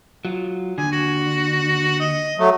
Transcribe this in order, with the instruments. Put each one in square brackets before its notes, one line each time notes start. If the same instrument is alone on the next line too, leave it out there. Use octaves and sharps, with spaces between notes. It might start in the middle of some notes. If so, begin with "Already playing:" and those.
[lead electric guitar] F#3 F4
[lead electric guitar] D#2 D3 [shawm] G#5
[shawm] F#4
D#5
[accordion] F#3 A3